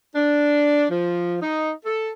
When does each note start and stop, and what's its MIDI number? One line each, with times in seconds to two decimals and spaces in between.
0.14 0.85 62
0.90 1.36 53
1.41 1.71 63
1.85 2.10 69